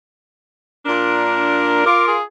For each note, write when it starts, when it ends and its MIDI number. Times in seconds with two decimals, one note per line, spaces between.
0.86 1.85 46
0.86 1.85 62
0.86 1.82 70
1.86 2.15 65
1.86 2.15 70
1.86 2.03 86
2.08 2.23 68